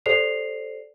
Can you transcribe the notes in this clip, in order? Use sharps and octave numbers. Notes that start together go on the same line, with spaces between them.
G4 A4 C5 D5 C7 F7